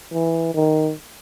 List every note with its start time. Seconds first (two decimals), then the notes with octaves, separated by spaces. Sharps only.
0.12 E3
0.54 D#3